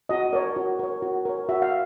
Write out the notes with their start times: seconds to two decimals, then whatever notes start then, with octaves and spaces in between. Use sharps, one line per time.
0.09 F#4 D#5
0.33 A#4 C#5 D5
0.56 F#4
0.79 A#4 C#5
1.02 F#4
1.25 A#4 C#5
1.49 F#4 E5
1.62 F5